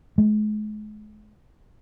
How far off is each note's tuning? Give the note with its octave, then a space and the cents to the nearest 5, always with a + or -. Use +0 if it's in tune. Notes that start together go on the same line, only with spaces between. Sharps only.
G#3 +40